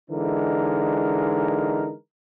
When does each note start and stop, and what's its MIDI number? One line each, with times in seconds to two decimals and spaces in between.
0.10 1.93 50
0.10 1.93 52
0.10 1.93 56
0.10 1.93 63
0.10 1.93 70